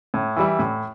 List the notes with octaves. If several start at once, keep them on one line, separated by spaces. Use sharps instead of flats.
A2
E3 G3 E4
A2